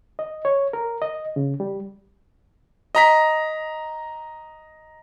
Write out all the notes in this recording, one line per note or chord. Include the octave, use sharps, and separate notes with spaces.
D#5
C#5
A#4
D#5
C#3
G3
D#5 A#5 B6